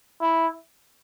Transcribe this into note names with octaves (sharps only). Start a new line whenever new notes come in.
E4